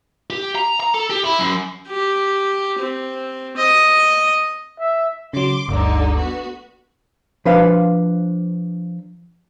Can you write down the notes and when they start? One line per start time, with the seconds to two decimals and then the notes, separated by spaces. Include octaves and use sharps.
0.30 G4
0.55 A#5
0.80 A#5
0.94 A4
1.10 G4
1.24 E4
1.39 F#2
1.88 G4
2.79 C4
3.57 D#5
4.80 E5
5.33 C#3 F#3 C6 D6
5.68 G1 D2 D3 G3 D#4 D6
6.17 B3 F#4
7.45 F3 D4 B4 C5 F5